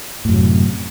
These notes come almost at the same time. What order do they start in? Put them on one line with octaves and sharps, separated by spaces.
A2 F#2 C3